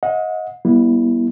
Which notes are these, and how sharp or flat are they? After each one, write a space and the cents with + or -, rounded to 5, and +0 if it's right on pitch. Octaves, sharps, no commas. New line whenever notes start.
D#5 +25 F#5 -35
G3 +0 B3 -35 E4 +0